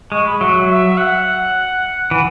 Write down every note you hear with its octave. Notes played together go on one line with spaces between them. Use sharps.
G#3 C#6
B5
F#3 E5
E5
F#5
E3